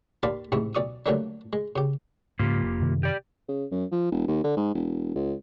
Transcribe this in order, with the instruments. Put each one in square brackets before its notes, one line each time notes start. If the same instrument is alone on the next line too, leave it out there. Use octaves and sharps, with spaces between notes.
[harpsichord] D#2 D5 F5 A5 B5 C6
A1 G#2 C3 E4 C#6
B1 D5 C#6 D#6
D3 F#3 G3 A3 A#3 D4
G#3
C#3 G4
[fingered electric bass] G#2 C#3 F3 [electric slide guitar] A#3 F4 G4
[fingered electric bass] F1
F#2 C3 D#3
[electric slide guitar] G4 D5
[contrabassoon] C#3
F#2
F3
E1
D#2
D3
G#2
E1
C#2